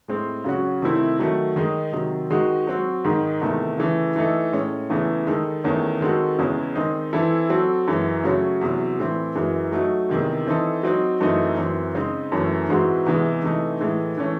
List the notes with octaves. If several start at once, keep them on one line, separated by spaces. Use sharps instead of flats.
A2 G#3 C4
C#3 F#3 C#4 F#4
C3 D#3 A3 C4 E4
D#3 F#3 A3
D#3 G#3 D#4
C3 D#3 F#3
D#3 G#3 D#4 F#4
F#3 C4 F#4
G#2 D#3 G#3 D#4
E2 C3 D#3 A3
C#3 E3 A3
E3 A3 D#4 A4
A2 G#3 C#4
E2 C#3 E3 A3
D#3 G#3 D#4 A4
E2 D#3 A3 C#4
D#3 G#3 C4 F#4 A4
E2 C#3 G#3 C#4 E4
D#3 G#3 C4 D#4 G#4
E3 C4 E4 A4
F#3 C4 F#4 A4
F#2 E3 G#3
C#3 F#3 A3 C#4
E2 C3 F#3
A2 E3 C4
F#2 E3 G#3
F#3 A3 D#4
E2 C3 D#3 G#3
E3 C4 D#4 A4
F#3 C4 D#4
F#2 E3 A3 C4 D#4
F#2 E3 C4
C#3 G#3 C4 D#4
F#2 E3 A3 C#4
G#2 E3 G#3 C4 F#4
E2 C3 E3 G#3
C3 E3 A3 D#4
A2 E3 G#3
E3 A3 C#4